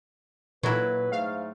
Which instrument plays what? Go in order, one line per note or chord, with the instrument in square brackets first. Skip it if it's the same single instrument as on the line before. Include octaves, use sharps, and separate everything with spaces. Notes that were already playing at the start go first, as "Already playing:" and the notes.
[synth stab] A#2 [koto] F#3 E4 [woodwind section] B4
[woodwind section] G#2 A3 [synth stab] F5